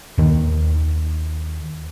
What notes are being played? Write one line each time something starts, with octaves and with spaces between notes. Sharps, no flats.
D#2 D#3